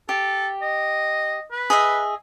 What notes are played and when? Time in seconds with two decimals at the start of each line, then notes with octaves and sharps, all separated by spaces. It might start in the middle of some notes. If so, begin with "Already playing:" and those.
0.09 G4 A4
0.62 D#5
1.52 B4
1.70 G#4 D#5 E5